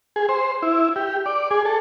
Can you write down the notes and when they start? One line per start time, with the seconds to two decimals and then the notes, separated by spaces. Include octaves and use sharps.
0.16 G#4
0.29 C5
0.62 E4
0.96 G4
1.26 D5
1.51 G#4
1.65 A4